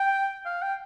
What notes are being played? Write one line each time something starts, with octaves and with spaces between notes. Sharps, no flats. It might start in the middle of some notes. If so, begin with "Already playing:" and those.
Already playing: G5
F5
G5